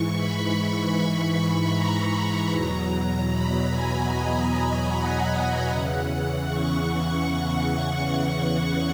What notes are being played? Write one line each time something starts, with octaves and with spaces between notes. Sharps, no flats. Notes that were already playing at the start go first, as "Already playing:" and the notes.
Already playing: G#2 E3 C#6
B5
A#5
E2 B2 F#3
B5
G#5
D#5
F#5
E2 C#3 E3
C#6